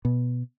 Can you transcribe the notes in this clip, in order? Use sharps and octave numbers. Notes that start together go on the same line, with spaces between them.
B2